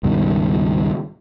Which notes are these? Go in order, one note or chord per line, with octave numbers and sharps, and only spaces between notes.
C#2 G2 B2 D#3